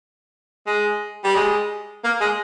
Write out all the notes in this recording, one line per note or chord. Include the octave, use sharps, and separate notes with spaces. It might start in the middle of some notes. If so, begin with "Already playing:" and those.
G#3
G3
G#3
A#3
G#3